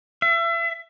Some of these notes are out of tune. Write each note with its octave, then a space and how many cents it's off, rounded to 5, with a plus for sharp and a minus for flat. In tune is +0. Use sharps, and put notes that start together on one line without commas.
E5 +35